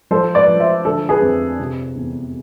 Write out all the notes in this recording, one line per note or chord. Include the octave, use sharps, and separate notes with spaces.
F3 A4 C5
B4 D5
F3
C5 E5
D3 A4
G#4 B4
F2
C3
E2